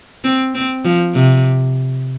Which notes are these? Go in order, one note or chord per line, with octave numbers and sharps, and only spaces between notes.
C4
C4
F3
C3